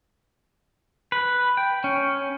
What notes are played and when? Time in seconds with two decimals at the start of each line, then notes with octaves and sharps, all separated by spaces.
1.12 B4
1.57 G5
1.84 C#4